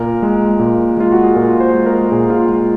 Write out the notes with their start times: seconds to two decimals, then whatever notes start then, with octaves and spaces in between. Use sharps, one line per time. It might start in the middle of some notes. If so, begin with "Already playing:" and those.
Already playing: A#2 A#4
0.22 G#3
0.59 A#2
0.97 G#3 F4
1.12 F#4
1.24 G#4
1.35 A#2 A#4
1.60 C5
1.74 G#3
1.86 A#4
2.12 A#2 G#4
2.30 F4
2.49 G#3